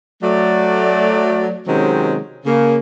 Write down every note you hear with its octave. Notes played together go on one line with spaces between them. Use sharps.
F#3 A3 D5
C3 D#3 F#3 G#3 C4 C#4
C#3 A#3